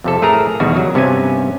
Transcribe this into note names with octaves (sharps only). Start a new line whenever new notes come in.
F2 C3 A4
A2 A3 G#4 A#4 A#5
E2 B2 D#3 G3 F#4
C#3 F#3 F#4
G2 C3 B3 C#4 G#5